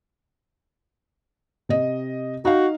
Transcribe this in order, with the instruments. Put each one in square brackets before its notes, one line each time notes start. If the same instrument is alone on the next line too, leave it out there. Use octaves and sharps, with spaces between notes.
[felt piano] C3 D#5
[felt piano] D#4 F5 [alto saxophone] F#4